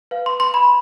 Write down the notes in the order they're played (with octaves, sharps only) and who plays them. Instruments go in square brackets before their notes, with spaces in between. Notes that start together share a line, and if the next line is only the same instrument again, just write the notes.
[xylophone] B4 F5
C6
C6
B5